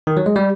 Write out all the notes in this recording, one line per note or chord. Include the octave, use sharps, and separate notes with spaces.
D#3
F#3
G#3
G3